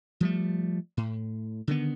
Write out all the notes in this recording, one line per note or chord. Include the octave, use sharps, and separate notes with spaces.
F3 G3 A3
A2
D3 D#3 B3